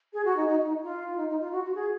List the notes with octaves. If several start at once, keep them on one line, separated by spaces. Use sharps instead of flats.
G#4
F#4
D#4
D#4
D#4
F4
D#4
D#4
F4
F#4
F#4
G#4